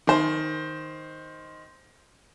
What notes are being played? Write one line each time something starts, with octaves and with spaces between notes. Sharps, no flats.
D#3 C5